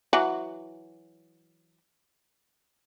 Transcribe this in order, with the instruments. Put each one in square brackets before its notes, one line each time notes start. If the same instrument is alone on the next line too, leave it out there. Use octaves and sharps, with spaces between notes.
[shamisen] E3 F#3 F#5